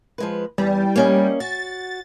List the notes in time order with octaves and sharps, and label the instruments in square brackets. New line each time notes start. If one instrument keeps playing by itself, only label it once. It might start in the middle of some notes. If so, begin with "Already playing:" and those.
[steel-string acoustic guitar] F3 G#3 B4
[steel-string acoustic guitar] E2 [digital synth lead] G3
[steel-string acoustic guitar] A#3 C#4 D#5
[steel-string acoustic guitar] F#4 [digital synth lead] A6